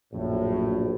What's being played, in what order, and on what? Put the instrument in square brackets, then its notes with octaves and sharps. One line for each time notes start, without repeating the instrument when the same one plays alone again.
[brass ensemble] A#1 F#2 A2